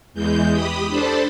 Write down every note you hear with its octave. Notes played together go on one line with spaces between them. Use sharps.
E2 E3 G#3 G6
G4 B5 D#6
D4 A4 C5 A5 B5